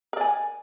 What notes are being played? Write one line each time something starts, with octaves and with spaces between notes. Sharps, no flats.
A#4 D5 G#5